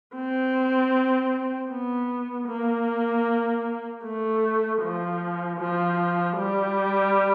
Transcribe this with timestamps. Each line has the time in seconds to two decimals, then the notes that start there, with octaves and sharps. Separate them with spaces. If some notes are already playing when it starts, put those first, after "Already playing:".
0.15 C4
1.70 B3
2.48 A#3
4.03 A3
4.82 F3
5.59 F3
6.37 G3